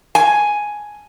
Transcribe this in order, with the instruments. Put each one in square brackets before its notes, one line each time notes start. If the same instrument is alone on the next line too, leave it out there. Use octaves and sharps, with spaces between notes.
[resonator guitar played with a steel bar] G#5